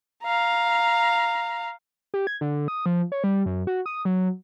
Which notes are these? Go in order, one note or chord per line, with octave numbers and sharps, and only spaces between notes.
F5 A#5
G4
G#6
D3
D#6
F3
C#5
G3
F#2
F#4
D#6
F#3